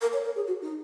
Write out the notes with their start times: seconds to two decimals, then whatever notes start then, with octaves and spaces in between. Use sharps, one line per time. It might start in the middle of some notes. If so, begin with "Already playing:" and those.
0.01 A#4
0.13 C#5
0.25 A#4
0.36 G#4
0.48 F#4
0.62 D#4